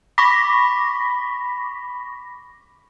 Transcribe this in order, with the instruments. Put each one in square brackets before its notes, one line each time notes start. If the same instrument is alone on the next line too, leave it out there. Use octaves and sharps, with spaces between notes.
[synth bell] B5 C#6 D6 A#6 B6